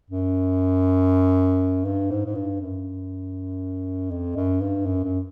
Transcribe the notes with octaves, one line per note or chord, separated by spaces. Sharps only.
F#2
G2
G#2
G#2
G2
F#2
F2
F#2
G2
F#2
F#2